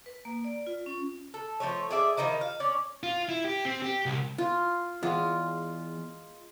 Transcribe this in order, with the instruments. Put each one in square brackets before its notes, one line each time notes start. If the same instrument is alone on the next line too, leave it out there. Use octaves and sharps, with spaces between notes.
[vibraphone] B4
A#3
D5
F4
C#4
[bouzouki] A4
F3 A3 C#5
G#4 D5 E5
D#3 F3 D#4 E4
F5
C#4 C#5 D5
[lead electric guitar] F4
E4
G4
C4
G4
C2
[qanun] F4
[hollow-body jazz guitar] E2 [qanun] G#3 F4